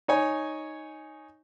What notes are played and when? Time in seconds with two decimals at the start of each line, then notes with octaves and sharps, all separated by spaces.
0.08 D#4 C#5 G#5